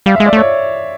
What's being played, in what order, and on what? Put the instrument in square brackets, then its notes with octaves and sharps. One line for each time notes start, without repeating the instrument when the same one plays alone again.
[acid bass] G3 [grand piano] F5
[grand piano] E5
[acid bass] G#3
[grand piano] D5
[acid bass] A3 [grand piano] C#5